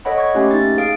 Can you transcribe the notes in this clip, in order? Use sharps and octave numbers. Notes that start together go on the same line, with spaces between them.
A4 C#5 D#5 F#5 B5
C#6 G#6
A3 A#3 C#4 G4
D#4 A6
G#4 F5 D7